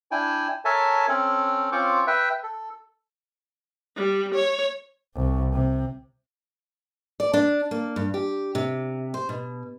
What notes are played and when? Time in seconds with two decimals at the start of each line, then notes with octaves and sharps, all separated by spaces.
0.11 D4 E4 G5 G#5
0.65 A4 A#4 C#5 E5 G#5 A5
1.08 C4 C#4 A4
1.72 C4 C#4 F4 C5 C#6 D6
2.07 B4 E5 G5
2.43 A4
3.96 G3
4.35 C#5
5.15 C2
5.53 C3
7.20 D5
7.33 D4
7.71 A#3
7.96 G2
8.14 G4
8.55 C3
9.14 C5
9.29 B2